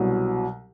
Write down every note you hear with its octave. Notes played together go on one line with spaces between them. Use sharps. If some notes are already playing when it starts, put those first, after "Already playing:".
Already playing: C2 B2 F#3